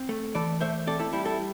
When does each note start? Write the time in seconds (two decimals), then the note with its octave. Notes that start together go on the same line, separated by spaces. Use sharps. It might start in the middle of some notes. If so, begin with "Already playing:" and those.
Already playing: C4
0.09 A3
0.35 E3 A4 D5
0.61 A3 C5 E5
0.87 C4 A4 D5
0.99 E4 A4
1.13 G3 E4
1.26 E4 A4